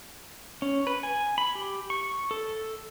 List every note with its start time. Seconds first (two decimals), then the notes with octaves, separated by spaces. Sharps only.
0.62 C#4
0.87 B4
1.03 G#5
1.38 B5
1.55 G4
1.90 C#6
2.31 A4